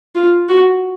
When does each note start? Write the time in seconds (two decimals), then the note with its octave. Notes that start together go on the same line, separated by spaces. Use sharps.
0.15 F4
0.49 F#4